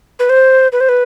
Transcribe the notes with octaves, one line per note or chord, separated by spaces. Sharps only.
B4
C5
B4
C5
B4